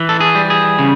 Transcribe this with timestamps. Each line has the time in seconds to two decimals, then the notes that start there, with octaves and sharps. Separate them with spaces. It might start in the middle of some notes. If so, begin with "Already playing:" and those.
Already playing: E3
0.09 A4
0.20 G#4
0.35 G3
0.50 G#4
0.79 C#3